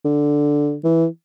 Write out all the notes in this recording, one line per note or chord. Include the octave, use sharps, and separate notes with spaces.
D3
E3